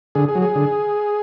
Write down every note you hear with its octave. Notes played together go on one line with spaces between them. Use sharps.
D3 G#4
G#4
F#3
G#4
D3